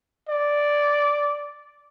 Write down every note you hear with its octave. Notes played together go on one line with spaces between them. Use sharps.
D5